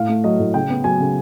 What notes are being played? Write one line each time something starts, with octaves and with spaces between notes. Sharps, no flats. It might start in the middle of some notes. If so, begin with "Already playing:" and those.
Already playing: A2 F5
A3
F#3 D#5
A2
C#3 G5
B3
F#3 G#5
C#3